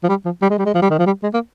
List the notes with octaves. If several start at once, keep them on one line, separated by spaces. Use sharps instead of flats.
F3
G3
F3
G3
G#3
G3
G#3
F3
G3
D#3
F3
G3
G#3
A#3